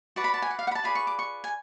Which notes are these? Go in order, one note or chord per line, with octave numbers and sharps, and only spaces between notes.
F#4 B4 D5 A5
B5
A5
G#5
F#5
F5
F#5
B5
A5
F4 G#4 B4 D5 B5
C#6
D6
C#6
G#5